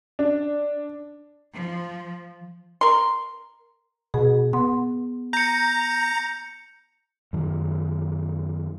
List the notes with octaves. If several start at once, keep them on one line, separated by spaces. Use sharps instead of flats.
D4
F3
A#4 C6
B2 G#4
B3 C6
A#5 G6 C#7
F#2 D#3 F3